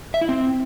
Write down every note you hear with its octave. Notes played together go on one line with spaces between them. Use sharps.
E5
E4
C4